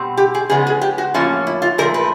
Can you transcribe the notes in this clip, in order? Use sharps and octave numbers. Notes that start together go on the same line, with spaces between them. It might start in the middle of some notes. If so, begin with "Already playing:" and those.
Already playing: B2 G3 C4
G4
G#4
C#3 F3 G#3 B3 G#4
G#4
G4
F#4
A2 F3 A#3 C#4 F4
E4
F4
A#2 F3 A3 A#4
B4